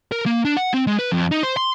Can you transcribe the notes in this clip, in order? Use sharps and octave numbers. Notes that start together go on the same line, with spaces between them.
A#4
A#3
D4
F#5
C4
G#3
B4
F2
D#4
C5
C6